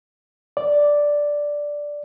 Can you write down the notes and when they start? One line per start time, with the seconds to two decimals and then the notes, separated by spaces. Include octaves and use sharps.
0.57 D5